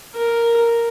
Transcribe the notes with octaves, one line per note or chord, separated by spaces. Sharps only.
A#4